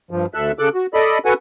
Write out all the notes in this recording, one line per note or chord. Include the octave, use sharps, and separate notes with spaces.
G2 F3
D2 A4 E5 F#6
C#3 A4 D6 F#6
F#4
A4 D5 D#5 B5
F#4 A4 B4 F#5 G#5